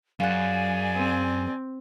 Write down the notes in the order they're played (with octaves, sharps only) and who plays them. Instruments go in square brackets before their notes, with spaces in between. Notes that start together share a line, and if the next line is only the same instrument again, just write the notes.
[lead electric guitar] F#2 [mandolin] F4 F#5 [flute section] G#4 D5 G#5
[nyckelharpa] C4